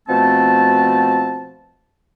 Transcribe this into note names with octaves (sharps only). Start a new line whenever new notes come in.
B2 F3 A3 C4 A5